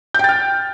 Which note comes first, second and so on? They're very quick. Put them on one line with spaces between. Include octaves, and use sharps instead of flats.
G6 G5 A6 F6